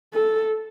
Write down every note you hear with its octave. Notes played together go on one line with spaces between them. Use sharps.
A4